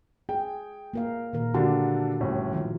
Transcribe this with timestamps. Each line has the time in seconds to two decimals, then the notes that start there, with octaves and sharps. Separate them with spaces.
0.29 G#4 G5
0.93 A#3 A#4 F5
1.33 A#2 D#3 A#4
1.54 D3 D4 F#4 G4 A4
2.20 G1 A2 C#4
2.53 D#3 F3